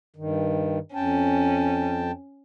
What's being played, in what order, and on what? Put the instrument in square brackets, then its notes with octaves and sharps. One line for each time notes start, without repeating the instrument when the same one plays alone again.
[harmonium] G2 D#3
[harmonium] F2 G5 A5 [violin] C#4